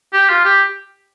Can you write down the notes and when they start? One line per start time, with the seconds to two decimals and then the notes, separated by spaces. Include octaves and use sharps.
0.13 G4
0.29 F4
0.45 G4